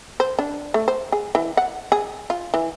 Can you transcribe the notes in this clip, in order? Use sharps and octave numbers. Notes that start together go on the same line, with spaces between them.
C5
D4
A3
C5
G#4
E3
F#5
G#4
F4
E3